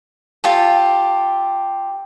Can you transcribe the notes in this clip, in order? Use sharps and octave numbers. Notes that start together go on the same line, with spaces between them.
F4 G4 A4